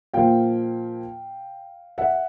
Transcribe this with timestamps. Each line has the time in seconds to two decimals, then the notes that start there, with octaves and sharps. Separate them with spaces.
0.14 A#2 F3 F5 G5
1.98 E5 F#5